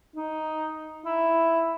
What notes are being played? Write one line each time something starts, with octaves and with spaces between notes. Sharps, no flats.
D#4
E4